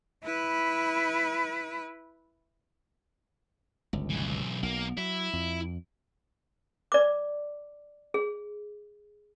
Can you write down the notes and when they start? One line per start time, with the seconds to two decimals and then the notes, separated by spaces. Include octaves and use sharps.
0.23 E4 B4
3.93 G1 C#2
4.10 B1 E3
4.63 B1 A#3 A#4
4.97 F#3 E4
5.33 F2
6.92 D5 D6
8.14 G#4